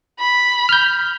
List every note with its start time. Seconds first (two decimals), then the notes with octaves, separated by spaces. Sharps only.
0.19 B5
0.69 F6 G6